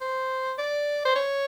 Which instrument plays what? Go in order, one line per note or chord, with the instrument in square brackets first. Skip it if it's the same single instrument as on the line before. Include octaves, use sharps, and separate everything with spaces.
[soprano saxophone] C5
D5
C5
C#5